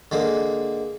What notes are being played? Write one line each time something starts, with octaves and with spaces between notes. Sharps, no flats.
D3 G#3 A#3